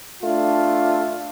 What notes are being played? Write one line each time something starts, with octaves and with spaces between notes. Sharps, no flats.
A3 D4 F4